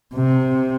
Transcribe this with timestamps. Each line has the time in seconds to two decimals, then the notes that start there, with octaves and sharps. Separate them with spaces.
0.15 C3